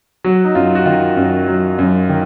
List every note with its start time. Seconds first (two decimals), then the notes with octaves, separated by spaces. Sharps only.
0.24 F#3 F#4
0.45 D#4
0.55 F#2 F4
0.75 F#4
0.86 D#3 F4
1.17 F#2
1.47 F#3
1.79 F#2
2.09 D#3